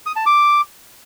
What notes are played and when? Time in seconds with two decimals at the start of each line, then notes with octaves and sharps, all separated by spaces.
0.06 D#6
0.16 A5
0.26 D6